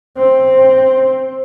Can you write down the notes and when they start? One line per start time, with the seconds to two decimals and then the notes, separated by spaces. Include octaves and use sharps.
0.18 C4